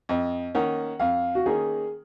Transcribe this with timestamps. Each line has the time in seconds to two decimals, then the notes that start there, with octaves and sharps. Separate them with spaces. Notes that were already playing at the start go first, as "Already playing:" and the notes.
0.09 F2 D#5
0.55 D#3 A#3 C#4 F#5
0.99 F2 F5
1.35 F#4
1.46 D#3 A#3 C#4 G#4